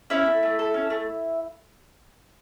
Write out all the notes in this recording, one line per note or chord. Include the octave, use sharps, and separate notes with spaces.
C#4 E4 E5
A3
A3
A4
C#4
A3